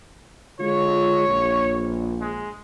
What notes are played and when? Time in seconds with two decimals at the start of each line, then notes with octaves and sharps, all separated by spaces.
0.60 D3 G#3 F4 C#5
1.27 A#1
2.21 G#3